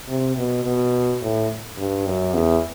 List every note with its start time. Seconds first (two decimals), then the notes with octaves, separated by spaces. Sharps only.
0.09 C3
0.37 B2
0.65 B2
1.22 A2
1.78 G2
2.06 F#2
2.34 E2